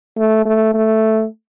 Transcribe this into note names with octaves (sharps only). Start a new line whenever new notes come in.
A3
A3
A3